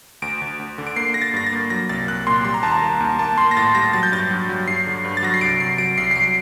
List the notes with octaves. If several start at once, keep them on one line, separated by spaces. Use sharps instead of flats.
D2 D7
D2
D2
D3
D7
A#3 C7
A#3 A#6
A6
G2 A#6
A6
A#3
F#3 A#6
C2 A6
C2 F#6
A#2 C6
G3 C6
A#5
D#2 A5
A#5
A#3
D#2
A#3 A5
A#3 C6
A#6
A2 A6
G3 A#6
F#3 A6
G6
G2 A6
F#3
F#3
G2 C7
D3
G2
A6
F#3 A#6
C7
C2 D7
C2 C7
F#3 D7
C2 C7
C7
F#3 D7